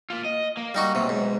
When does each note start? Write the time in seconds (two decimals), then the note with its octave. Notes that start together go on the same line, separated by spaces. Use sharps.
0.10 A#3 F4
0.25 D#5
0.57 A#3
0.75 G3 D#4 F#4
0.95 B1 C3
1.09 G#2